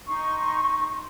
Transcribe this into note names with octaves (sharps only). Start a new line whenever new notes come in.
D#4 C6 C#6